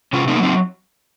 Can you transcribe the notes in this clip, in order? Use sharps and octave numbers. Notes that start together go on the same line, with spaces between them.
C3 C#4 F4
C4 D#4
A#3
F#3 C4 D#4